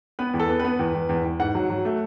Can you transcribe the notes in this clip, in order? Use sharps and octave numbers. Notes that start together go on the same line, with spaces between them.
B3 B4
E2
A4
B3
B4
B3
E2
E2
E2
E2
G#2 F#5
F#3
F#3
A3